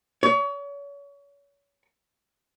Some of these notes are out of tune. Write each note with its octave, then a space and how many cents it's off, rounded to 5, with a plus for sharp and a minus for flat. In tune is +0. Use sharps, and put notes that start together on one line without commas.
C#5 +35